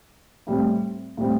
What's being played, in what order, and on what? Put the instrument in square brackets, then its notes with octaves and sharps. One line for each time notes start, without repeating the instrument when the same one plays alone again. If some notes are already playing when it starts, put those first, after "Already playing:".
[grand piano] A2 G3 C4
A2 G3 C4